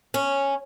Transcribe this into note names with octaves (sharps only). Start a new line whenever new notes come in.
C#4